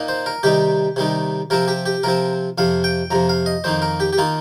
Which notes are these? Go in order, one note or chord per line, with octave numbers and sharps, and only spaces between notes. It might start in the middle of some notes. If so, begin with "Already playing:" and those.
Already playing: A#2 A#3 D#4
C5
A#4
C3 D#3 G3 D#4 G4
C3 D#3 G3 D#4
C3 F3 C4 A#4
G4
G4
C3 F3 C4 A#4
F2 C3 F3 F5
G5
F2 C3 F3 A#5
F5
D#5
F2 D#3 A#3 D#4 C5
A#4
G4
G4
D#3 A#3 D#4 F4